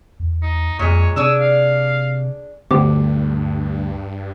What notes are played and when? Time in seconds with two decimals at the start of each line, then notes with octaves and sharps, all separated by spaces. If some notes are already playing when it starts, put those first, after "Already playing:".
0.20 E2
0.43 D#4
0.79 F2 A#2 G#3 C#5
1.16 C3 D4 G#4 C#5 E6
1.40 F5
2.71 D2 G2 B3 G4 C5 D6